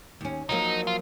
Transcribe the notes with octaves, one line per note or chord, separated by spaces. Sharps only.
D#2 C#4
F3 F#3 A#3 D#4
F4